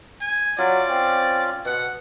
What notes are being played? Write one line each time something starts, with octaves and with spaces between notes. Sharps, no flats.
G#5
F#3 C#4 F4 D5
C4
B2 F#5